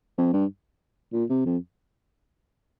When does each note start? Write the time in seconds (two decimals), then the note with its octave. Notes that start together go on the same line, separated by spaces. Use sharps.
0.18 F2
0.33 G2
1.13 A#2
1.29 C3
1.45 F2